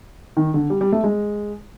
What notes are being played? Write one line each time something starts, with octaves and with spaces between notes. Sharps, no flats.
D#3
D3
G3
G3
A3
G#3